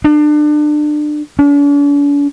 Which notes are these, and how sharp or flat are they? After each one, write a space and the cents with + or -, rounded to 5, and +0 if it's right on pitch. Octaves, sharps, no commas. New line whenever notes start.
D4 +30
D4 -45